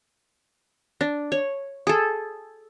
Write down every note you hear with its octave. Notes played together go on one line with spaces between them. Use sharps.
D4
C#5
G#4 A4